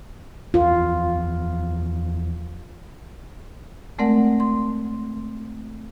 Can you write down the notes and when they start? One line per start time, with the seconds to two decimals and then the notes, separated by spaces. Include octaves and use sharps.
0.54 E2 F3 F4
3.98 G#3 A3 C4 A#4 D5 F#5
4.40 C6